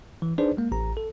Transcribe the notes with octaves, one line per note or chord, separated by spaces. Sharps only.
E3
D4 D#4 G#4 B4 C5 D5
G#3 A#3
A1 A#5
A4